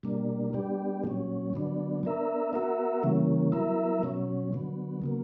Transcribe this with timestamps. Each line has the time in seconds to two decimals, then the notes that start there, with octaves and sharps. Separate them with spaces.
0.03 B2 G3 A#3 D4
0.53 G3 B3 D4 G4
1.04 A#2 F#3 C#4
1.53 D3 F#3 B3 D4
2.03 B3 D4 A#4 E5
2.53 B3 F#4 A#4 E5
3.03 C#3 E3 G3 A#3 C#4
3.52 F#3 B3 E4 A#4 E5
4.03 B2 F#3 C#4
4.53 D3 F#3 B3
5.02 C#3 F#3 A#3